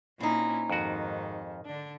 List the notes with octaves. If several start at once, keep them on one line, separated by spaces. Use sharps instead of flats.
A#2 C4 C#4 D#4 E4
F2 G#2 D#3 F#4
D3 D4